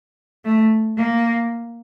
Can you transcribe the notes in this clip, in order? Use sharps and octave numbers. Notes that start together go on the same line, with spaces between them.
A3
A#3